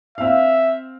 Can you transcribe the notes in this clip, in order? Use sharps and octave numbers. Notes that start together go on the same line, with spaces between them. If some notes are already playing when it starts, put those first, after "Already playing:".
C4 E5 F5